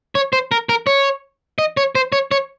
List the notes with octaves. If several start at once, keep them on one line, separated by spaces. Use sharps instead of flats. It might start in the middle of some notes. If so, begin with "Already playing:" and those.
C#5
C5
A#4
A#4
C#5
D#5
C#5
C5
C#5
C#5